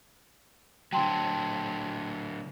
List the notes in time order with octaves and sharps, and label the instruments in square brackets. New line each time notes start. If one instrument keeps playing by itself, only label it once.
[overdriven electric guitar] D3 F#3 [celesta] G5 A5 C6